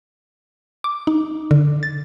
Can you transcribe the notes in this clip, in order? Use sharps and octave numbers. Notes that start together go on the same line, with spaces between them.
D6
D#4
D3
A6